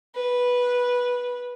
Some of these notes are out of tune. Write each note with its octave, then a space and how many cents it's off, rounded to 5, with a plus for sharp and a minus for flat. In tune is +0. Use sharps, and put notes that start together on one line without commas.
B4 -10